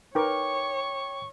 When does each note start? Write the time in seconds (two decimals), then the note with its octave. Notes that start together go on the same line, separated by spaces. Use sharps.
0.15 D#4 A#4 B4 C#5 G5 C#6 D6